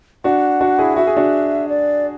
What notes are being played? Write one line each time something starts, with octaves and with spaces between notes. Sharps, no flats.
D4 F#4 F#5
D4 F#4
E4 G#4
F#4 E5
G#4
D4 F#4
D5